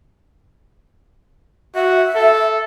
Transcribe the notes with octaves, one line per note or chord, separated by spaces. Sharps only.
F#4 E5
A4